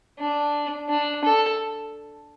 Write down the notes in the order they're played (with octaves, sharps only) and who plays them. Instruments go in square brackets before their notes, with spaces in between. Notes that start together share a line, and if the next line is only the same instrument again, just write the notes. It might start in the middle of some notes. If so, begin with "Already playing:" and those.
[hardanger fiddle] D4
D4
A4